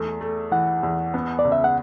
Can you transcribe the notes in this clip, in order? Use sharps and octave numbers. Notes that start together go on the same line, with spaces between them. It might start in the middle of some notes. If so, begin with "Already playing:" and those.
Already playing: E2 A3
A3
E3 F#5
E2
B3
D5
C#2
E5
F#5